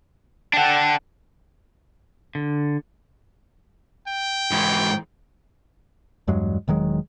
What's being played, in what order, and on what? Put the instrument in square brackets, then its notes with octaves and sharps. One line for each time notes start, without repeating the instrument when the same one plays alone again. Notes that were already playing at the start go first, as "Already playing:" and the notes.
[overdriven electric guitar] D4 A4 [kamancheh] F#5 G5
[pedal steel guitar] D3
[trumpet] G5
[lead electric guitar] G#2 E3
[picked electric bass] E2 G2 F#3 G#3
E1 D#3 F#3 G#3